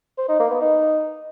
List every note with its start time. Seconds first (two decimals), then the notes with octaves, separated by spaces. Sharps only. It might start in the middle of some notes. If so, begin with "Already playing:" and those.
0.18 C5
0.28 D#4
0.39 A#3
0.50 B3
0.61 D#4